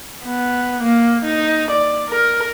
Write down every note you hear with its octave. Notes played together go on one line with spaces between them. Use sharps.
B3
A#3
D#4
D5
A#4